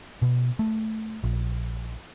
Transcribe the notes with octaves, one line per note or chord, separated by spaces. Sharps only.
B2
A3
A#1